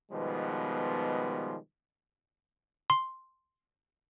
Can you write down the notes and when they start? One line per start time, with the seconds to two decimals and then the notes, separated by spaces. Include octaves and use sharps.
0.12 B2 D#3 F3 G3 G#3 B3
2.90 C6